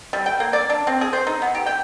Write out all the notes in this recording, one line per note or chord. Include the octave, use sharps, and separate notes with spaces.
G3
G5
A#3
D5
D4
C4
G#4
C5
D#4
B3
G4
G5